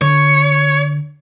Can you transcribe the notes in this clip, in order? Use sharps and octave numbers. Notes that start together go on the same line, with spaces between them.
D3 C#5